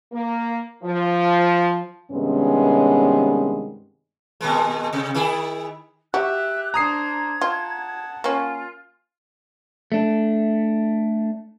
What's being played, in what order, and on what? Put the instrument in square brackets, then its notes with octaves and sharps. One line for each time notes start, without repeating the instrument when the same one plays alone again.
[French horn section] A#3
F3
G2 C3 D#3 G#3 B3 C#4
[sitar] A#2 D#3 G#3
C3
D#3 E4 G#4
[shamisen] F#4 [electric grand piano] G4 [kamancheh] E5 [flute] F#6
[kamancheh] D4 C5 [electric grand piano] A#5 D#6 C7 [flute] G#6
[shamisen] F4 [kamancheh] F#5 A5
[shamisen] A#3 C#4 [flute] F4
[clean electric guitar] A3 D4